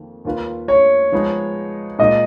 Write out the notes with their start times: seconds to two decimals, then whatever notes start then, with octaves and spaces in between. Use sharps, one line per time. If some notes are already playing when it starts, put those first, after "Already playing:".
Already playing: F2 D#3 A#3
0.25 D#2 D#3 A#3 F4 B4
0.68 C#5
1.12 F3 G#3 B3 D#4
1.99 A#2 G#3 D#4 D#5